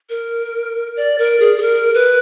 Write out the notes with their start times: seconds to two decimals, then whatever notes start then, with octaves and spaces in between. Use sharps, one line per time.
0.09 A#4
0.96 D5
1.18 A#4
1.40 G#4
1.57 G#4
1.62 A#4
1.95 B4